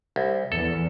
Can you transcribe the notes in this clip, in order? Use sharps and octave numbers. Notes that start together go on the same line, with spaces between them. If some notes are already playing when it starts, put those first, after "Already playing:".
C2
E2 A4